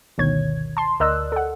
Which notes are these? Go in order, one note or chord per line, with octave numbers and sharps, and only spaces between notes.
G1 D2 B2 D#3 C#5 G#6
A5 C6
D2 A#4 D5 D#5 E6 F#6
A4 F#5